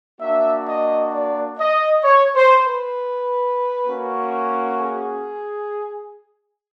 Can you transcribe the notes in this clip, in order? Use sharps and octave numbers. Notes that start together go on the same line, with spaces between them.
A#3 D4 F#4 E5
D#5
D5
D#5
C#5
C5
B4
A#3 C#4 F#4
G#4